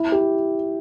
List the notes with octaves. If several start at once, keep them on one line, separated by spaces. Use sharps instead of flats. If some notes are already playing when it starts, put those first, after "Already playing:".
Already playing: E4
G4